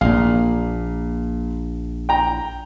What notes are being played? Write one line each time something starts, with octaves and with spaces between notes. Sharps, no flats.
A#1 A#2 F5
G5 A#5